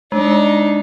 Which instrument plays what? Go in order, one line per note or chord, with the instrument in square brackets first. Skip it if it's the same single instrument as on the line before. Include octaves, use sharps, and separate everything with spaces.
[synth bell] G#3 [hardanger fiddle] D4 D#4